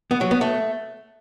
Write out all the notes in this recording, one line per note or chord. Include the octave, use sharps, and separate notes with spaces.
B3
F#3
B3
A3